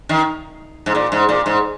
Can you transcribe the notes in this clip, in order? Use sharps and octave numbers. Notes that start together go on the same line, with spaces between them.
D#3
G#2
A#2
G#2
A#2
G#2